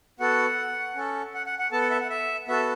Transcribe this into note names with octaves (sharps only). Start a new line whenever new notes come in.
B3 F#4 A4 F#5
C#4 A4
F#5
F#5
F#5
B3 A4 A5
F#5
E5
F#5
E5
B3 F#4 A4 E5